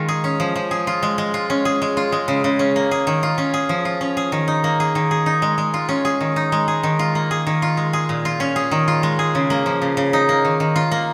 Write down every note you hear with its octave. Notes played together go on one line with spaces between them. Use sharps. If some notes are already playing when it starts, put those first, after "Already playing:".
Already playing: D#3 G#3 F4
G#4
C#4
F3
F3
G#4
F4
G#3
G#3
F4
C#4
G#4
G#3
F4
G#3
C#3
C#3
C#4
A#3
G#4
D#3
F4
C#4
G#4
F3
F4
C#4
G#4
D#3
D#4
A#3
G#4
D#3
G#4
D#4
G#3
G#3
F4
C#4
G#4
D#3
D#4
G#3
G#4
D#3
F4
A#3
G#4
D#3
F4
G#3
G#4
A#2
F4
C#4
G#4
D#3
F4
G#3
G#4
C#3
A#3
F3
C#3
C#3
D#4
A#3
D#3
D#3
F4
A#3